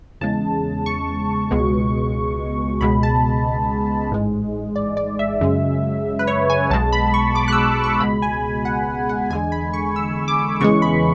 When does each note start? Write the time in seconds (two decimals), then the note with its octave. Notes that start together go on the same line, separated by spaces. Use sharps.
0.21 E2 C#3 G#3 A5
0.86 C#6
1.51 C#2 B2 G#3
2.81 C#2 B2 G#3 B5
3.03 A5
4.11 A1 G#2 G#3
4.76 D5
4.97 D5
5.19 E5
5.41 F#2 C#3 G#3
6.19 B4
6.27 C#5
6.50 G#5
6.70 B1 B2 G#3 A5
6.93 B5
7.14 C#6
7.35 D6
7.48 F#6
7.52 E6
7.84 C#6
8.00 C#2 B2 G#3 B5
8.22 G#5
8.65 F#5
9.09 F#5
9.30 E2 D3 G#3 G#5
9.52 B5
9.73 C#6
9.96 E6
10.28 D6
10.60 E2 C#3 E3 G#3 C#6
10.82 B5